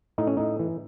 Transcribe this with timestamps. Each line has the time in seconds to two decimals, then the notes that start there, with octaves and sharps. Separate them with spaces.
0.18 A2 D#4
0.27 C#4
0.37 A2 D#4
0.59 E3